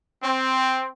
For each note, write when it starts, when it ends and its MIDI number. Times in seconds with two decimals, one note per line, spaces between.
0.23 0.90 60